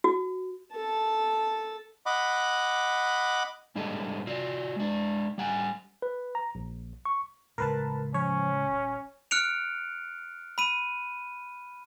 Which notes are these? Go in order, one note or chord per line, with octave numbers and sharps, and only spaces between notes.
F#4
A4 A5
D#5 F#5 B5 D6
G#2 G3 D4 G#4 A4 D#5
F4 F#4 D5
G#3 D4
G3 F#5 G#5
B4
A#5
A#1
C#6
C#2 A2 A#4 B4 A5
F3 C#4 C#5
D#1
F6 F#6 C#7 D7 F7
B5 D#7